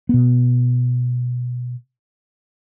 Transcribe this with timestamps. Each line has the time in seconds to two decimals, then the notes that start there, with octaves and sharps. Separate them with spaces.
0.09 B2 B3